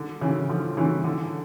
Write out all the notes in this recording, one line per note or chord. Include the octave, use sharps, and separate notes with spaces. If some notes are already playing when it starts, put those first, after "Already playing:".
Already playing: D3
C#3 E3
D3 F3
C#3 E3
D3